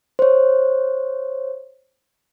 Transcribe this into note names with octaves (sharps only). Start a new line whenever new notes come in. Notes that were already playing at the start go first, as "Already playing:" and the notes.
C5 C#5